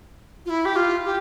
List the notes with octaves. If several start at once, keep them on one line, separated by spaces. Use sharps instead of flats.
F4
E4
G4
F4
G4